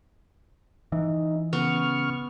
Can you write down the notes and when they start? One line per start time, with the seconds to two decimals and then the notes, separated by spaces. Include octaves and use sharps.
0.92 E3 D#4
1.53 C#3 B3 C#6 F6